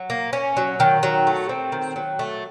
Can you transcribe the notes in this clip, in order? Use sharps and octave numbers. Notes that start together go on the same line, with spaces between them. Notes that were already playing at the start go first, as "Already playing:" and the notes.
Already playing: F#3
A#3
C#4
F#3
D#3
F#3
A3
C4
D#3
F#3
A3